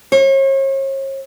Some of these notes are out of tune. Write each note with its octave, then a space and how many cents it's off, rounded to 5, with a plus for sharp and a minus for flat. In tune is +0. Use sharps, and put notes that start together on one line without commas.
C#5 -40